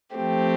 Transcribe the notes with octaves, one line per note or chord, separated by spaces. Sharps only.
F3 A3 C4 G4